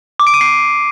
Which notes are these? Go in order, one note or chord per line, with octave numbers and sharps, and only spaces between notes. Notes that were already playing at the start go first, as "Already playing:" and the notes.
D6
D7
D#7
C7